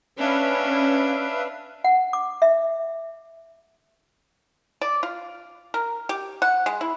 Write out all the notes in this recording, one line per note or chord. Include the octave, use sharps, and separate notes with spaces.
C#4 D4 B4 E5 F5
F#5
D6
E5
D5
F4
A#4
G4
F#5
G#3
E4